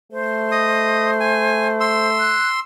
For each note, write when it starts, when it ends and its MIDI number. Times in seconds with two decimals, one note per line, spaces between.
0.12 2.40 57
0.12 2.10 72
0.52 1.11 75
0.52 1.11 87
1.20 1.68 80
1.81 2.60 84
1.81 2.60 88
2.18 2.48 90